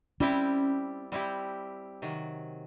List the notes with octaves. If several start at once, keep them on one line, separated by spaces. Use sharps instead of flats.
G3 C4 C#4 E4 G4
G3 C4 E4 G4
C3 D#3 F#3